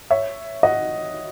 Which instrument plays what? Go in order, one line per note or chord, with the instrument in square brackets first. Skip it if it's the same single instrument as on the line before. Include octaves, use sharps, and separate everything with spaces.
[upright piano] C#5 E5
D#5 F#5